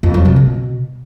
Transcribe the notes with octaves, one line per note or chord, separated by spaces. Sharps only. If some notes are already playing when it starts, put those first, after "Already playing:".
F2
F#3
C3
B2